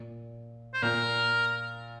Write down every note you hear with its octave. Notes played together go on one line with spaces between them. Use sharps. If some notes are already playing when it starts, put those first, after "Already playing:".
Already playing: A#2
C5
A#2 A#4